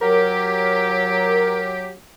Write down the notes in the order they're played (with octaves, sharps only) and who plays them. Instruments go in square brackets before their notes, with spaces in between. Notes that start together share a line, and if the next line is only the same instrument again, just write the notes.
[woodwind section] F#3 G4 [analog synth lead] A#4